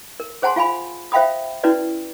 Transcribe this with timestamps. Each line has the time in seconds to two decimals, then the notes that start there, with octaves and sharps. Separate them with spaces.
0.20 A#4
0.42 G#4 C5 F#5 G#5 A5 C6
0.56 F4 F5 G#5 B5
1.12 C5 E5 F5 G5 B5 D#6
1.64 C#4 E4 F#4 B4 D5